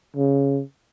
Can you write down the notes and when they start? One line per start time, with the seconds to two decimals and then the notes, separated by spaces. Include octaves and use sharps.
0.16 C#3